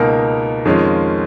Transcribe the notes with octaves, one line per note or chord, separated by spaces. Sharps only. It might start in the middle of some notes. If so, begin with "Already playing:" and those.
Already playing: C#2 B2 A#3 D#4 A#4
F2 D#3 G#3 C#4 F4